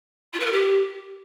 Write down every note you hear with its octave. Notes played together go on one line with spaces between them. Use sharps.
F4
B4
A#4
G4